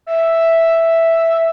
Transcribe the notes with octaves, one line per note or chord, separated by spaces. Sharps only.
E5